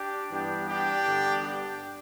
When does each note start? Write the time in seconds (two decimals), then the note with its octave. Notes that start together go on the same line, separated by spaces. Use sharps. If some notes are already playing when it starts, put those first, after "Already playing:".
Already playing: D4 G4
0.31 G2 E3 B3 D4 G4
0.68 D4 G4
1.05 G2 D3 B3
1.42 D4 G4